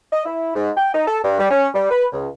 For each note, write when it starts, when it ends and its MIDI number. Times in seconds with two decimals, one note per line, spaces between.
0.12 0.24 75
0.26 0.54 64
0.55 0.71 44
0.77 0.93 79
0.94 1.05 63
1.07 1.18 69
1.24 1.39 43
1.39 1.47 55
1.51 1.69 61
1.74 1.88 55
1.91 2.06 71
2.12 2.28 37